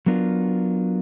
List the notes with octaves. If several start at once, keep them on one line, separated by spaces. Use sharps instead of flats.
F#3 B3 D4 F4 A#4